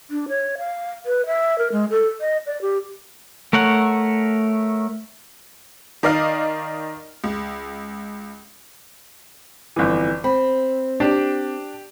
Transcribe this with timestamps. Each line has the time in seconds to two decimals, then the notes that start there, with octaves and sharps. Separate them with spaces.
0.11 D4
0.29 C#5
0.58 F5
1.06 B4
1.26 E5
1.58 A#4
1.72 G#3
1.90 A4
2.21 D#5
2.46 D5
2.62 G4
3.53 A3 A#4 C#5 F#5
6.03 D#3 A#4 D5 D#5 F5 F6
7.24 C#2
9.76 G1 F2 E3
10.24 C4 B5
11.00 D4 G4